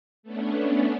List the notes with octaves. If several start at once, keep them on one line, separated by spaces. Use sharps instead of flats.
A3 B3 C#4 D4